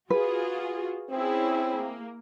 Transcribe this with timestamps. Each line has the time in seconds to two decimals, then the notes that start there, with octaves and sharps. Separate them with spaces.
0.10 F4 F#4 G#4 B4
1.10 C4 C#4 E4 G#4
1.76 A#3